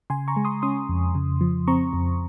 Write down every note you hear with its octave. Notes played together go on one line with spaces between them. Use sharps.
C#3 G#5 C6
A#5 C#6
G#3
C6 D#6
C#4 C6 D#6
F2
C#3
F3
C4 A#5 C#6
F2